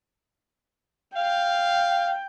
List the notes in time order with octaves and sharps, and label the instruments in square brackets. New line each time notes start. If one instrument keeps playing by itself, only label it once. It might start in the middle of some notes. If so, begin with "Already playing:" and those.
[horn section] F5 [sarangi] G5